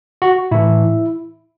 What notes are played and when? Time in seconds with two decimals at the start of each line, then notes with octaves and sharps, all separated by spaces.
0.22 F#4
0.51 A2 E3 E4